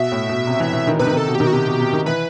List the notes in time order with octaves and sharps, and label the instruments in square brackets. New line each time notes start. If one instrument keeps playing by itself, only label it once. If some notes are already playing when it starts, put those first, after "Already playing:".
Already playing: [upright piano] B2 [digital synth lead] E5
[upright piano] A2
B2
C3
E3
E3
D#3
[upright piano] C3 [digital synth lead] B4
[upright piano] D#3
[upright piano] C3 [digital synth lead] A4
[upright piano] B2
[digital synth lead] G4
[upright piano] D#3
[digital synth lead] F#4
[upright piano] C3 [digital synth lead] G4
[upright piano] B2
C3
D#3
[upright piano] E3 [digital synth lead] B4